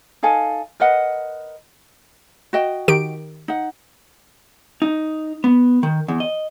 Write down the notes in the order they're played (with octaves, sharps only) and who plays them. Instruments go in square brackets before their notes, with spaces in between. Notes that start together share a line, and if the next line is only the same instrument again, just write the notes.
[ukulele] D#4 A4 F5 G#5
A#4 B4 D#5 F#5
F#4 D#5 G5
[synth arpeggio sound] D#3 G4 D7
[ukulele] D#4 F#5
[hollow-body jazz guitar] D#4
B3
D#3
E2
D#5